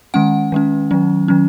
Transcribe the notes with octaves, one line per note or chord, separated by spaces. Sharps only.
D#3 G#3 C#4 F#5
D#3 G#3 C#4
D#3 F#3 C#4
D#3 F#3 C#4